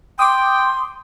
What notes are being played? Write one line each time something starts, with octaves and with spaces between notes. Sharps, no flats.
G5 C6 D6 D#6